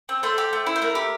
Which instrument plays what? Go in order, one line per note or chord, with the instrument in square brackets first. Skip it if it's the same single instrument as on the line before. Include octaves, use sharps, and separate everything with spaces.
[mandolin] C4
A3 C5
G4
A3
E4
C5
A3 A#4
G4